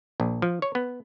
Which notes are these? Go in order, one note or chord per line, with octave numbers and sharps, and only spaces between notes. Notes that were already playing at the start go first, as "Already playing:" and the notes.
A#1
F3
C#5
B3